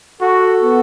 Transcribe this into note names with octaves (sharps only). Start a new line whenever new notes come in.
F#4 A4
B3